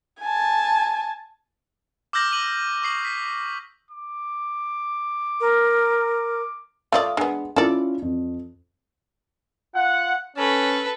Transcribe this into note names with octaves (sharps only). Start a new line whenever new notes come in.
G#5 A5
D6 E6 F6 G6 A#6 F#7
D6 D#7 F#7
C#6 D#6 C7 F#7
B6
D6
A#4
A3 F4 D5 E5 F5 D#6
G#3 B3 D4
C#4 E4 F4 A4 D5
F2
F4 F#5
C#4 A4 B4